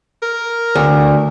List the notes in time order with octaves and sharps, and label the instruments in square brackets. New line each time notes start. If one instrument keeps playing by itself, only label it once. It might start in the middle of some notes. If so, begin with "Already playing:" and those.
[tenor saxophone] A#4
[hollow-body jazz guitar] D2